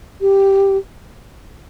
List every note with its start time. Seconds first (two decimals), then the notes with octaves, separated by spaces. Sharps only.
0.21 G4